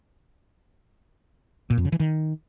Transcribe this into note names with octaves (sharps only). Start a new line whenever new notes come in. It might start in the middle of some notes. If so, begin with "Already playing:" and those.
A#2
F2
C#3
E3
D#3